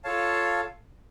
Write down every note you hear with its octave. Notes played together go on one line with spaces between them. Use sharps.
F4 A4 C#5 F5 A5